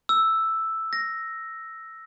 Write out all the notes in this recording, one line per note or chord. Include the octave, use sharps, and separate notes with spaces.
E6
A#6